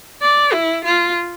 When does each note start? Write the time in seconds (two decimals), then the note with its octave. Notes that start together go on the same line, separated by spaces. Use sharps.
0.22 D5
0.52 E4
0.85 F4